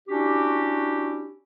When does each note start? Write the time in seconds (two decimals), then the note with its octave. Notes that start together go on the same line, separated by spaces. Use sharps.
0.08 C#4 D4 E4 F#4 G4